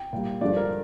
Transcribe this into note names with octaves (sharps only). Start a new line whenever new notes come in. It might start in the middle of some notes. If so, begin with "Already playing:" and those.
Already playing: G5
A#2 G3
G2 D3 F3 G#3 D5
A#4